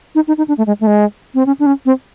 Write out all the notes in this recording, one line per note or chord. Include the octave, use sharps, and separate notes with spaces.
D#4
D#4
D#4
D4
A3
G#3
A3
G#3
C4
C#4
D4
C#4
C4